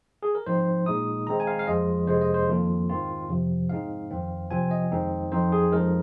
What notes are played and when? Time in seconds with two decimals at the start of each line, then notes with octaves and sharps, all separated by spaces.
0.23 G#4
0.35 A#4
0.46 G#2 F3 C4 D#4 C5
0.86 A#2 G#3 D#4 D#6
1.27 D#3 G#3 C4 A#5
1.40 G#5
1.47 F5
1.59 F5
1.67 F2 F3 G#3 F4 D#5
2.07 F2 C3 G#3 C5
2.21 D#5
2.34 C5
2.48 F2 D#3 A#3 F4
2.89 G#2 D#3 C4 F4
3.29 F2 C3 F3
3.70 G#2 G#3 C4 D#4 F5
4.11 F2 D#3 C4
4.51 C3 F3 C4 F4 G#5
4.71 D#5
4.92 F2 D#3 G#3 C4 D#4
5.32 F2 F3 C4 D#4 C5
5.52 G#4
5.72 F2 F3 G#3 D#4 A#4